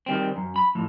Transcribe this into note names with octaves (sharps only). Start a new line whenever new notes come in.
D#3 G3 C4
F#2
B5
A2 F3